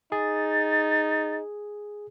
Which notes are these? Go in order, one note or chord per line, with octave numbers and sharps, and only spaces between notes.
D#4 G#4 A6